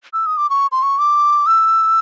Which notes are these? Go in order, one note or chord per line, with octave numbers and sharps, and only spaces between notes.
E6
D#6
D6
C#6
C6
C#6
D6
E6